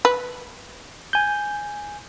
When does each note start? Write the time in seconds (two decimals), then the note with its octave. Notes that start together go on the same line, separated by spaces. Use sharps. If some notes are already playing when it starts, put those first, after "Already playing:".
0.05 B4
1.13 G#5 G6